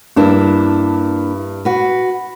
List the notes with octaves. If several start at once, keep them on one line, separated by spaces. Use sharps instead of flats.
G2 A#3 D4 E4
F#4 B4